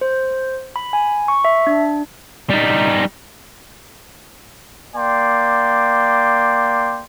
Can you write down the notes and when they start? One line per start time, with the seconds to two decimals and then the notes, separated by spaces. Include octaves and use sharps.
0.01 C5
0.76 B5
0.93 G#5
1.28 C#6
1.45 E5
1.67 D4
2.50 G3 D#4
4.95 A#3 D5 G5 C6